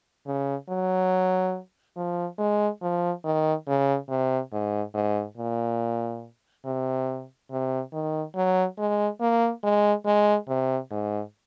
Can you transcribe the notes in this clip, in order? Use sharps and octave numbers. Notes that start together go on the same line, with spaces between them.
C#3
F#3
F3
G#3
F3
D#3
C#3
C3
G#2
G#2
A#2
C3
C3
D#3
F#3
G#3
A#3
G#3
G#3
C3
G#2